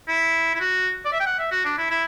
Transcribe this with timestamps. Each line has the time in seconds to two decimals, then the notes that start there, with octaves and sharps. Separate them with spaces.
0.08 E4
0.55 E4
0.60 F#4
1.05 D5
1.12 E5
1.20 G5
1.26 F#5
1.39 E5
1.51 F#4
1.65 D4
1.78 E4
1.90 E4